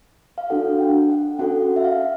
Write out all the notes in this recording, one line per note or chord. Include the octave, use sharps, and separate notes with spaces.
F5
D4 F#4 A4 F#5
G5
F#5
C#4 F#4 A4 F#5
E5
F5